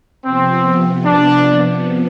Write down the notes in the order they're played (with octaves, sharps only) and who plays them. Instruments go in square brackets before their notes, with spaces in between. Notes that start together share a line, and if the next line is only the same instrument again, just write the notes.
[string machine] C3 F3 B3 [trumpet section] C4
[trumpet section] D4